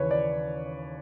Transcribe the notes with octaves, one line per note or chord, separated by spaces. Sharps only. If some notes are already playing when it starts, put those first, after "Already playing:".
Already playing: D#2 C#3 E3 B4 C#5
D5